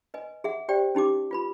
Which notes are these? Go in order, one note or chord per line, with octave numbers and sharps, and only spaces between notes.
B4 D#5 G#5
G#4 E5 F#5
G4 C5 D5 G5
C#4 D#4 G4 D6
F4 B4 B5